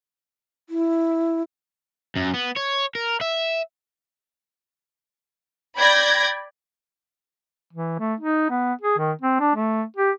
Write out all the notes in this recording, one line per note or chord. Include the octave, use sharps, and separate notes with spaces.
E4
F#2
B3
C#5
A#4
E5
D5 G5 B5 G6 G#6 A#6
E3
A3
D#4
B3
G#4
D#3
C4
D4
A3
G4